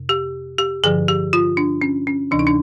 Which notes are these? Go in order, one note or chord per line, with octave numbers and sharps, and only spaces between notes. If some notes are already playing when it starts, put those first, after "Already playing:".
Already playing: F2 C3
G4
G4
G2 D3 F3 G#4
G4
F4
D4
C#4
C#4
D2 C3 E3 D4
D#4
D4